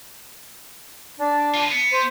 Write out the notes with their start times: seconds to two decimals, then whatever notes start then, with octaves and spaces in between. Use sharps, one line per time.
1.17 D4
1.54 F4 B4
1.71 B3
1.90 C5